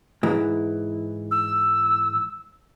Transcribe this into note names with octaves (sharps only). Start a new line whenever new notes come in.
G#2 E3
E6